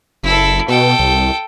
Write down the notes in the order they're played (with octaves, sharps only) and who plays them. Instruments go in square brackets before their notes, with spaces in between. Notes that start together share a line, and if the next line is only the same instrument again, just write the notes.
[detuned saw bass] F#1 [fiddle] E4 A4
[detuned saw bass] B2 [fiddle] A4 G5
[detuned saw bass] C2